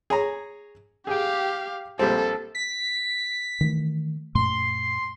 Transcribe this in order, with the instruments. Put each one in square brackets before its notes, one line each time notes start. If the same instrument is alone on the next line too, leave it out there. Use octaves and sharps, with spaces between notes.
[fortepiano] G#4 C#5 A#5
[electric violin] G4 F5 [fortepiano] G#4 G5
[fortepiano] A#1 G3 C4 [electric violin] A4
[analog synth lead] B6
[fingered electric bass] D#3 E3 A3
[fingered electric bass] F#2 A#2 A3 [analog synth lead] C6